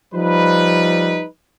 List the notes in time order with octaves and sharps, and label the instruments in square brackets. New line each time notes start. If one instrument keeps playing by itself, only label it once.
[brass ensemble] F3 G3 D#4 B4